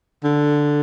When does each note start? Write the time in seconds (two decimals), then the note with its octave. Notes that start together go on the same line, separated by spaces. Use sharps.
0.24 D3